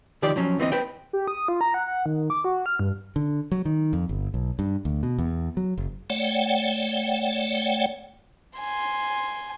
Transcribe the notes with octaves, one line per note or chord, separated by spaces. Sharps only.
C#2 D#3 F3 G4 D5
F3 F#3 C#4
D2 E3 C4 D#5
B4 C5 G5
G4
D#6
F4
A#5
F#5
F#5
D#3
D6
F#4
F6
G2
D3
F#3
D#3
F2
G1
B1
G2
D2
B2
E2
F#3
F#1
A3 C#5 D5 F#5 G5
G#5 C6